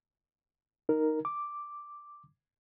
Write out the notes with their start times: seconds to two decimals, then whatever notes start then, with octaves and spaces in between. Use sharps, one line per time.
0.89 D#4 A#4
1.25 D6